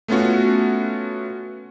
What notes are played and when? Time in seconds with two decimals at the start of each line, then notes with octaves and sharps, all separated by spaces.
0.08 A3 B3 C#4 F4 F#4